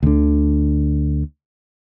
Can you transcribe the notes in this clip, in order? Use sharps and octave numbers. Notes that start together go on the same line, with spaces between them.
D2 D3